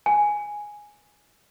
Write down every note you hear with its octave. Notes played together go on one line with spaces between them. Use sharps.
G#5